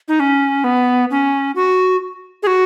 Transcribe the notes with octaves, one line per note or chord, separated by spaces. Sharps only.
D#4
C#4
B3
C#4
F#4
G#4
F#4